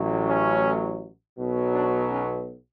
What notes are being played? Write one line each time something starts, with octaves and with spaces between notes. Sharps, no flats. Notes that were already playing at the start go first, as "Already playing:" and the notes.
Already playing: A1 A2 F#3
C#4
B1 B2 F#3
D4
C#4